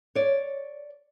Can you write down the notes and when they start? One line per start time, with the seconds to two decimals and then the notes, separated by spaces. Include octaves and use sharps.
0.15 C#5 D5